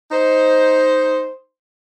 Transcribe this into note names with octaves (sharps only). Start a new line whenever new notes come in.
D#4 C5